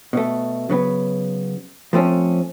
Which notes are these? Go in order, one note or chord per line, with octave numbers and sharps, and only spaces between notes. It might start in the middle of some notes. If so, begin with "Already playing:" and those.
B2 A3
C#3 F#3 B3
F3 A3 C4 C#4